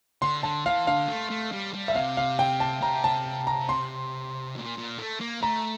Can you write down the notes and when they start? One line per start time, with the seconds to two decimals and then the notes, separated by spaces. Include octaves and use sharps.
0.22 D3 C6
0.43 D3 A5
0.66 E3 F5
0.87 D3 F5
1.08 A3
1.31 A3
1.52 G3
1.74 G3
1.88 E5
1.95 C3 F5
2.17 F5
2.39 G5
2.60 A5
2.82 C3 A#5
3.04 A5
3.47 A#5
3.69 C6
4.56 A#2
4.78 A#2
4.99 A3
5.21 A#3
5.42 A3 A#5